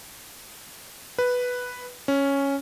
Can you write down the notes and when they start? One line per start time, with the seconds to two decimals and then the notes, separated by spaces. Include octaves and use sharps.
1.18 B4
2.08 C#4